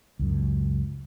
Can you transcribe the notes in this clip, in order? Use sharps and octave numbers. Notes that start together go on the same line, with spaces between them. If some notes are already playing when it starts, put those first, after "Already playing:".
C#2 F#2